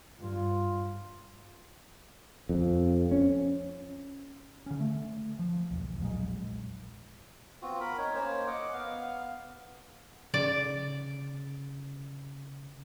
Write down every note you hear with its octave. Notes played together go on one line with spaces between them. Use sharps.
G2 F4
F2
C#4
D3 C#4
A3
F3
B1 E2
E1 A#1 F#3 G#3
B3 C4 F4 F#4
A#4 B5
D#4 C#5
A#3 C#4 C5 C#5
D#5 F#5 D6
B3 F5
C#3 D5